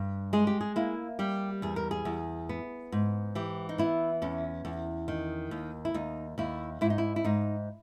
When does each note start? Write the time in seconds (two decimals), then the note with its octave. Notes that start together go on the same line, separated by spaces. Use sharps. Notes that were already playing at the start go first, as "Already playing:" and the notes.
Already playing: G2
0.33 G#3 G#4
0.47 G4
0.61 G#4
0.76 A#3 E4
1.19 G3 G4
1.62 E2 G#4
1.76 A#4
1.91 G#4
2.05 E2
2.49 B3
2.92 G#2
3.35 E3 G4
3.69 D#4
3.78 B3 E4
4.22 E2 C#4
4.65 E2
5.08 D#3
5.51 D#2
5.85 E4
5.94 D#2 D#4
6.38 D#2 E4
6.81 G#2 E4
6.90 D#4
6.98 E4
7.16 E4
7.24 G#2 D#4